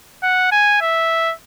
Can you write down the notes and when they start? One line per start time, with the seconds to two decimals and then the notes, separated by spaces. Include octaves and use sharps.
0.23 F#5
0.52 G#5
0.82 E5